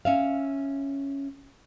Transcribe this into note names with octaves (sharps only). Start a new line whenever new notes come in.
C#4 E5 F5